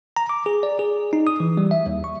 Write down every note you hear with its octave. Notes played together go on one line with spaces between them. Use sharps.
A#5
D6
G#4
D5
G#4
D#4
D#6
E3
G3
E5
D#2
C#6